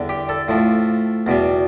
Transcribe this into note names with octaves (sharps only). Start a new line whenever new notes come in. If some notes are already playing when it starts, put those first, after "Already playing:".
Already playing: E2 D3 G3
G4
A4
A2 F3
E2 B2 G3